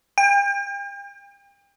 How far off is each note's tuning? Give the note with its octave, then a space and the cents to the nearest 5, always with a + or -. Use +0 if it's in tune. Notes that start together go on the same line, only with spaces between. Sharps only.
G5 +35